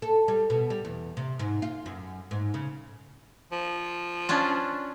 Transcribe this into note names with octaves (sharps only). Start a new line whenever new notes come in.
A4
G3
B2
G3
E2
C3
G#2
F4
F#2
G#2
C#3
F3
C#4 D4 F4